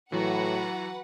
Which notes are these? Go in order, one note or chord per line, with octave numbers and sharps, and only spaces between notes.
A2 E3 F#3 F#4 B4 F#5 A#5